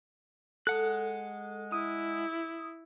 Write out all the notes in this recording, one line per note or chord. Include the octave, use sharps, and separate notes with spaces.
G#3 A4 F#5 F#6
E4 D#6